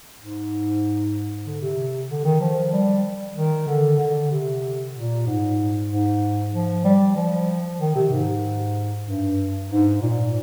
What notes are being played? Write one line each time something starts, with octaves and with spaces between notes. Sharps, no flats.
G#2
D3
C3
D3
D#3
F3
G3
D#3
D3
D3
C3
A#2
G#2
G#2
F3
G3
F3
D#3
C3
G#2
G2
G#2
A#2